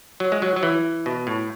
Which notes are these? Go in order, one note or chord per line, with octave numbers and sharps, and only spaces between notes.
F#3
G#3
F#3
F#3
E3
B2
A2